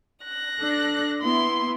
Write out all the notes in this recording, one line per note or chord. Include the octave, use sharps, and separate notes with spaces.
F#6 A#6
D4 A4
B3 E4 C6